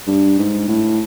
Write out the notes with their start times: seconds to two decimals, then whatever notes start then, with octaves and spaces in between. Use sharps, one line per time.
0.07 G2
0.38 G#2
0.68 A2